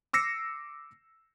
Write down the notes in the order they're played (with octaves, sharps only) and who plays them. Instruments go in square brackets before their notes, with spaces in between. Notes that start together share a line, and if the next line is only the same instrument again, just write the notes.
[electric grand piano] D6 E6 A#6 C7 C#7